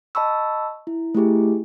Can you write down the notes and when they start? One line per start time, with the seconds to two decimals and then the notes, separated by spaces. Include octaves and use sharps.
0.15 D#5 A5 B5 C#6 E6
0.87 E4
1.15 A3 E4 G4 G#4